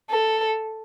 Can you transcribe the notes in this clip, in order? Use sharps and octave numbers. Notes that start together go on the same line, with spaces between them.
A4